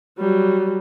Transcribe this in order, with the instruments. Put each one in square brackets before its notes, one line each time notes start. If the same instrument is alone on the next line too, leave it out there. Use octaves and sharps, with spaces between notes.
[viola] F#3 G3